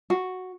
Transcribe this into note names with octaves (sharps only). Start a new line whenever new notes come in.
F#4